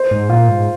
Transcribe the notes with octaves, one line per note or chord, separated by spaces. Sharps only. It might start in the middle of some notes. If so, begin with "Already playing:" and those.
Already playing: C5
G#2
A#2 F4
G#2